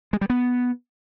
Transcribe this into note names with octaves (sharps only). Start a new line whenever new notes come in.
G#3
G3
B3